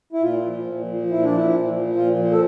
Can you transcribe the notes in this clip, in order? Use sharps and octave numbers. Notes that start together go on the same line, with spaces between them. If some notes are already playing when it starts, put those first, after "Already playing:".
E4
A#2 F4
F3
A#2
F3
A#2 E4
D4
F3 E4
A#2
F3
A#2 F4
F3
A4